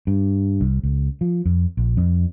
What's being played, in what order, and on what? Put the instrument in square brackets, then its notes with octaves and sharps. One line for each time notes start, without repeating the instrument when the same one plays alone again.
[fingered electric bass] G2
C2
C#2
F3
F2
A#1
F2